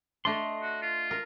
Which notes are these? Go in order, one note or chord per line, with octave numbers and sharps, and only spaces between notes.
A3 D4 D#5 C6
F#4
F4
A#4